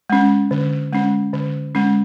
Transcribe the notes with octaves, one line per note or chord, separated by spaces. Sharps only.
G#3 C#4
D3
G#3 C#4
D3
G#3 C#4